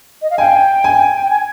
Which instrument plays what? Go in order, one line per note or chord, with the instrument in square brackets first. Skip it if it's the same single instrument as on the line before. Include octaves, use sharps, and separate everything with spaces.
[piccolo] D#5
F5
[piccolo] G5 [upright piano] G#5
[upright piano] G#5
[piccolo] G5
G#5